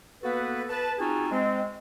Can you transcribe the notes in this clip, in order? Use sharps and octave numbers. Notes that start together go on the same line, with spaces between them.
A#3 B3 F#4 A4 B4
B4 A5
C4 C#4 D#4 F4 F#4 G#4
G#3 C4